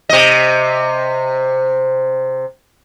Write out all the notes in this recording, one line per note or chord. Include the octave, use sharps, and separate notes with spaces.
C3 D#5